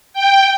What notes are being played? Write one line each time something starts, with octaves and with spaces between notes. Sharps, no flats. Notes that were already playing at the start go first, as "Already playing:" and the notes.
G5